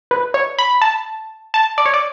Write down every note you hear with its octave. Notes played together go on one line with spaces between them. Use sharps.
B4
C#5
B5
A5
A5
D5
C#5
D5